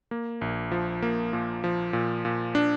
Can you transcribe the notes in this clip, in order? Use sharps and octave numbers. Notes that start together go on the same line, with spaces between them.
A#3
A#1
F3
A#3
A#2
F3
A#2
A#2
D4